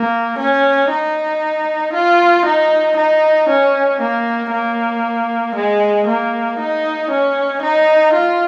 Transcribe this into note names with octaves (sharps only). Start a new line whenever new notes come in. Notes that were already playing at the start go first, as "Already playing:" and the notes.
Already playing: A#3
C#4
D#4
F4
D#4
D#4
C#4
A#3
A#3
G#3
A#3
D#4
C#4
D#4
F4